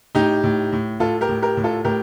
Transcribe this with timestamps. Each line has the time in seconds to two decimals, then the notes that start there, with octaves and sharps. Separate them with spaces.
0.15 A2 D#4 G4
0.43 A2
0.72 A2
1.00 A2 F4 A4
1.21 G4 A#4
1.29 A2
1.42 G4 A#4
1.57 A2
1.64 F4 A4
1.85 A2 G4 A#4